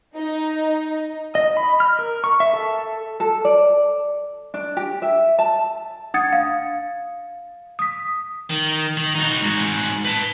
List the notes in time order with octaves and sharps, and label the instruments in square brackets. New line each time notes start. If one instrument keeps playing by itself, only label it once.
[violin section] D#4
[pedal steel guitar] D#5
B5
F6
A#4
C#6
E5
A4
[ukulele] A4
D5
D4
G4
E5
A5
[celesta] D4 F#5 D#6 G#6 A6 C#7
F5
D#6 B6
[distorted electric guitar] D#3
D#3
D#4 F#4
G#2 F#4
B4 A5